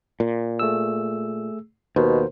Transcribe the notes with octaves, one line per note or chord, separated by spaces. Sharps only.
A#2
A3 G#4 E6
D#2 B2 A#4 C5